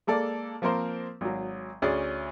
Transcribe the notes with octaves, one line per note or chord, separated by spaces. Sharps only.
G#3 A#3 A4 D5
F3 A#3 C4 A#4 C5
G#1 F#3
D2 C#4 G#4 D5